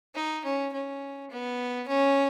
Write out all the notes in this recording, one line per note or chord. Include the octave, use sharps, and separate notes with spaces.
D#4
C#4
C#4
B3
C#4